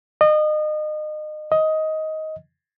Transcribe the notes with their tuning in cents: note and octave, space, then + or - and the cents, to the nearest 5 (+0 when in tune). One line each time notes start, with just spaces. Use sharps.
D#5 -30
D#5 +15